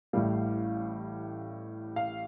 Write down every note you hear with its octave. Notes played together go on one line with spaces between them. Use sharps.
A1 A2 G3 F5
F5